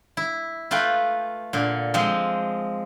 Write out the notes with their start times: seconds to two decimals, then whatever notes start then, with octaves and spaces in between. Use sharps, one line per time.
0.17 E4
0.71 A3 F4 B4 G5
1.53 A#2 D3
1.94 F3 G#3 C4